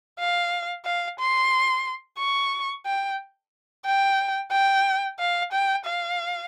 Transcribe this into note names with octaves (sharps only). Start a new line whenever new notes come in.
F5
F5
C6
C#6
G5
G5
G5
F5
G5
F5